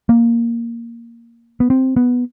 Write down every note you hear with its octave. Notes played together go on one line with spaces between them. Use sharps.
A#3
B3
C4
B3